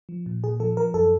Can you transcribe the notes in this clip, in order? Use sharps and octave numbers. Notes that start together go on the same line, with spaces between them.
F3
A#2
A#2 G#4
F3 A4
F3 A#4
F#2 A4